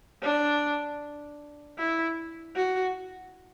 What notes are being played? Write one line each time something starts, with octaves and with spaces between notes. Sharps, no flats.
D4
E4
F#4